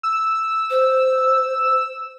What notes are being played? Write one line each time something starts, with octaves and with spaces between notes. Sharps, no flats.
E6
C5